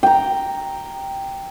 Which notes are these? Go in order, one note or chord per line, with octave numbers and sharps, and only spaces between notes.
G5 A#5